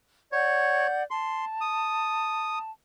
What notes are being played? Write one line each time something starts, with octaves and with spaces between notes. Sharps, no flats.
C#5 D5 F#5 G6
A5 C6
D#6